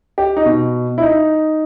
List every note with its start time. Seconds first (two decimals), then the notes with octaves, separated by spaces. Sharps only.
0.18 G4
0.37 D#4
0.46 B2
0.98 E4
1.02 D#4